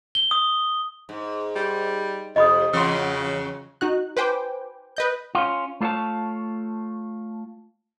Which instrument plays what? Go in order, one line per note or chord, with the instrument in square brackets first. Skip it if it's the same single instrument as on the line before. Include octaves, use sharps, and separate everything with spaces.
[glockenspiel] G7
D#6
[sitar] G#2
[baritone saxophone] G3
[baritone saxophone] F2 [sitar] C3 [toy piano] D#5 B5 D#6
[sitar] E2 F#3 [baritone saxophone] C#3 [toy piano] C6 E6
[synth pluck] D#4 F#4 F#6
B4 C5 G5 G#5 D6
B4 D#5 G6
[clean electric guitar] C#4 F4
A3 F4 C5 C#5 A5